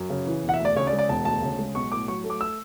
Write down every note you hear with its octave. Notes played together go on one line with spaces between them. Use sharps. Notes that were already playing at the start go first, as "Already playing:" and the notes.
Already playing: F#2
C#3
E3
E1
F#5
E5
D2
D5
C#3 C#5
D5
G#3
D5
E1 A5
D2 A5
C#3
G#3
B1 C#6
A2 D6
F#3 C#6
A3
D6
E6